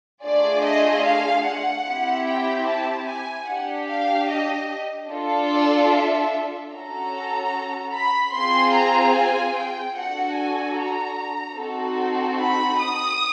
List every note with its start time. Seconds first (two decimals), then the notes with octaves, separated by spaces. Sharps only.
0.24 A3 D4 F4 G#4 D5
0.64 D#5
1.05 F5
1.46 F#5
1.86 C4 E4 G4
2.27 G5
2.67 A5
3.07 G#5
3.48 D4 G4 F#5
3.89 F5
4.30 D#5
5.10 D4 F4 A4
5.51 D5
5.92 E5
6.72 C#4 F#4 A4 A#5
7.94 B5
8.34 C4 F4 G#4 C6
8.74 A#5
9.16 G#5
9.56 G5
9.96 D4 F#4 A4 F#5
10.36 G#5
10.77 A#5
11.58 C4 D#4 F#4 A4
12.39 B5
12.79 D#6